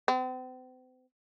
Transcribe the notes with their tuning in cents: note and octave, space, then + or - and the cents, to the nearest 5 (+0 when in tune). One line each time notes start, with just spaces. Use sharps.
C4 -40